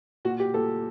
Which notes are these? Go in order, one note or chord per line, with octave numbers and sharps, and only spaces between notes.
A#2 F#4
G4
A#2 A4